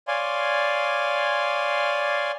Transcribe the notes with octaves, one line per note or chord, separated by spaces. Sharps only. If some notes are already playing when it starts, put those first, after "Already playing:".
C#5 D5 F5 G#5 C6